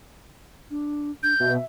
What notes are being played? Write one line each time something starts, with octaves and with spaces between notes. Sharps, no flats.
D4
D4 G6
B2 E5